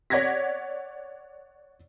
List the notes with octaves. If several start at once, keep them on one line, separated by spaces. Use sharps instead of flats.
C#5 D5 F#5 G#6 A#6 B6